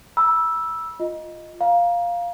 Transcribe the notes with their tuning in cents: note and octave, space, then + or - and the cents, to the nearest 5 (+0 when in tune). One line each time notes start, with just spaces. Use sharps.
B5 -40 E6 +0
F4 +0 D#5 +0
F5 +0 A#5 +20